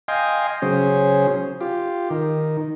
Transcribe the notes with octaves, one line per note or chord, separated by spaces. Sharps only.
D#5 F5 G5 G#5 C6
C#3 F#3 C#4 G#4 C5
F4 G4
D#3